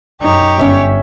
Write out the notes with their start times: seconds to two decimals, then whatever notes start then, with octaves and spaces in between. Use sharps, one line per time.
0.22 F#2 D#4 G4 C#5
0.58 G1 C#4 E5 C#6